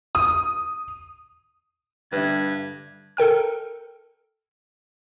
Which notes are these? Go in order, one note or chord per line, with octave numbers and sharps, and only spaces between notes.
D#6
G2 D3 G3 B4 D5 E5 G#6
A4 A#4 G5 F6